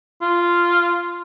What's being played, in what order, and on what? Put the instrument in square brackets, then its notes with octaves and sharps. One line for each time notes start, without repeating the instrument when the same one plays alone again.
[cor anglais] F4